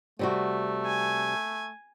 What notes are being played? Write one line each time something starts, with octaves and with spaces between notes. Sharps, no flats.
C3 G3 A3 F#4
G#5